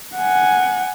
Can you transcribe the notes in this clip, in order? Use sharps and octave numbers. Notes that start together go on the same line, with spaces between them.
F#5 G#5